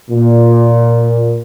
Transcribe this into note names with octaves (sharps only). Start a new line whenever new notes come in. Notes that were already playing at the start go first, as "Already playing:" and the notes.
A#2